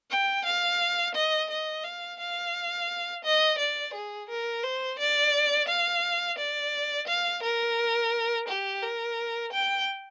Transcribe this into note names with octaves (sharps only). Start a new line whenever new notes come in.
G5
F5
D#5
D#5
F5
F5
D#5
D5
G#4
A#4
C5
D5
F5
D5
F5
A#4
G4
A#4
G5